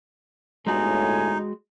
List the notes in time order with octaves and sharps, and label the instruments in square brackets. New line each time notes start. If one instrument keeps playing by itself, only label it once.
[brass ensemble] G1 A2 G#5 [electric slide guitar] G#3 F#4 [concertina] D#4